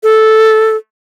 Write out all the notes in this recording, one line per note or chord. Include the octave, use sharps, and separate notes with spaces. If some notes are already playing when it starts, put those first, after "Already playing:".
A4